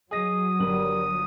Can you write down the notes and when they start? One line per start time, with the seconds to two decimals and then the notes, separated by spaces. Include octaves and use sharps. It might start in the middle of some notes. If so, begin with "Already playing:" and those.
0.11 F#3 G#4 D#5 D#6 A#6
0.60 G1 G2 G3 A#4 F#7